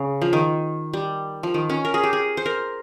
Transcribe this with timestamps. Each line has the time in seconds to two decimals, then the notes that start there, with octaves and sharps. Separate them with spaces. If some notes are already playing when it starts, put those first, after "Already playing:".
Already playing: C#3
0.22 F3
0.33 D#3
0.93 G3
1.43 F3
1.54 D#3
1.70 C#4
1.85 A#4
1.94 G#4
2.03 G4
2.13 G#4
2.37 C5
2.46 A#4